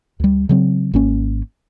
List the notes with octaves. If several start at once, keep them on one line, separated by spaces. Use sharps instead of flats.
D2 G3
C#3 F#3 C4
G#1 A#3 C#4